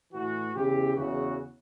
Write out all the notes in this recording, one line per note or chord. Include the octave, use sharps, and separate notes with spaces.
A2 E3 F#4
E2 C#3 E3 G4
E2 C#3 E3 F#4